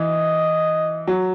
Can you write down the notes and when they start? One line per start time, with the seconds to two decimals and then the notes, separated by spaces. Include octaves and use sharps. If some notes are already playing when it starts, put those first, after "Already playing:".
Already playing: E3 D#5
1.07 F#3